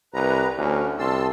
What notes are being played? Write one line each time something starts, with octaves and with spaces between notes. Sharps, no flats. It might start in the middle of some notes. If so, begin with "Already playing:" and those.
C2 B4 A#5
D2 C#4
C2 A5 C6 E6